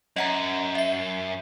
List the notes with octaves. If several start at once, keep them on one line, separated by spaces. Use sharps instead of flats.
F#2 D#5 F#5 A#5
E5 C7